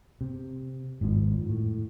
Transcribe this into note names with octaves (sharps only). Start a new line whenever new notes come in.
C3
G#1 F2 G#2 F3
A2